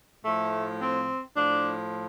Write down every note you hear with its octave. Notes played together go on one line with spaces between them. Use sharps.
A2 F3 A3
C4
A2 F3 D4